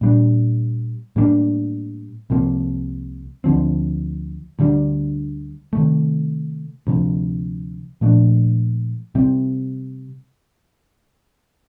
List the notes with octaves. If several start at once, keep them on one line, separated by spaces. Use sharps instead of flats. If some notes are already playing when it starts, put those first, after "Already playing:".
A#2 G3 D4
A2 G3 A#3 D4
C2 C3 F3 A#3
D2 D3 F3 C4
D2 D3 G3 D4
C3 D#3 A3
D2 C3 F3
A#2 F3 A3 D4
C3 G3 C4